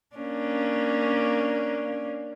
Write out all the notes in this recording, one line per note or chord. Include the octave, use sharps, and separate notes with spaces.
A#3 C#4 D4